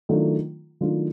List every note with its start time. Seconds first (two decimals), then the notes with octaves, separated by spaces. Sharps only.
0.09 D#3 F#3 A3 D4 F4
0.81 D#3 F#3 A3 D4 F4